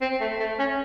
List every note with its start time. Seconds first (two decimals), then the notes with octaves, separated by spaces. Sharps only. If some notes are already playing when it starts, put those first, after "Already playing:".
0.01 C4
0.21 A3
0.40 A3
0.59 C#4